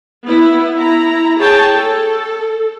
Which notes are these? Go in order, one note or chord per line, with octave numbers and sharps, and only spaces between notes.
B3 E4
E4 A#5
G#4 C#5 G5 A5
A4